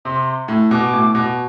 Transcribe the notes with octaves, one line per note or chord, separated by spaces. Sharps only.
C3 C6
A2
B2 D6
A2
B2